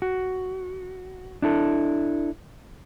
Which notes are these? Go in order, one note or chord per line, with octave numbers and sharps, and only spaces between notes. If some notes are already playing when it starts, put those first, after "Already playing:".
F#4
D4 E4 A4